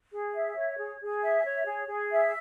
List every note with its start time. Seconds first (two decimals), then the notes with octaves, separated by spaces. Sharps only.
0.12 G#4
0.34 E5
0.57 C#5
0.78 G#4
1.01 G#4
1.22 E5
1.45 C#5
1.66 G#4
1.88 G#4
2.11 E5